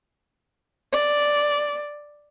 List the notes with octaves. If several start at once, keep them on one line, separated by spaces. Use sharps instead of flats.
D5